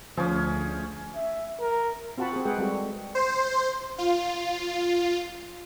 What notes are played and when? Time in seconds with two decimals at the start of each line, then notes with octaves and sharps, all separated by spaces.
0.17 D2 F3 C#4 G#4
1.16 E5
1.60 A#4
2.18 C4 F4 F#4 F#5 A5 B5
2.33 C4 G4 G#4
2.45 G#3 G#4 B4 F#5 G5
2.58 G3 G#3 C4 F#4 A4
2.74 A4
3.15 C5
3.98 F4